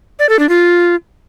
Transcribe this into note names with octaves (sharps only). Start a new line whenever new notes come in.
D5
A4
D4
F4